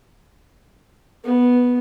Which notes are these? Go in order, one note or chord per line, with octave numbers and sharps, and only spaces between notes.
B3